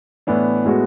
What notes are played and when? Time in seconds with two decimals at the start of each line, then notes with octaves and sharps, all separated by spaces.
0.27 A2 E3 B3 D4
0.65 A2 G#3 B3 F#4